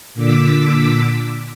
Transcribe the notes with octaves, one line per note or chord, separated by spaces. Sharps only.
A#2 D3 D6 E6 B6